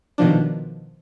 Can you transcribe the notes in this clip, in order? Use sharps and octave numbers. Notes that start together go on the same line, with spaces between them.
B2 D#3 F3 D4